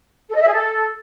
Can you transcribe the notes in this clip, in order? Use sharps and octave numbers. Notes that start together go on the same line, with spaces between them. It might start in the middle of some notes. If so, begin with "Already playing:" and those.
A4
D#5
E5
G#4
A4